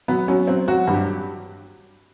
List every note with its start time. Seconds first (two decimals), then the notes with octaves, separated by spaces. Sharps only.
0.08 F#3 B3
0.28 F#3 C#4
0.47 F#3 C4
0.68 F#3 F#4
0.87 G2
0.94 G4